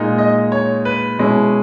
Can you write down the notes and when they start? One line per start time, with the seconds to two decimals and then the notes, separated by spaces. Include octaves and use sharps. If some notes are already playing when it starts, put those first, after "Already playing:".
Already playing: A#2 G#3 D#4
0.18 D#5
0.52 C#5
0.85 B4
1.19 B2 G#3 C#4 E4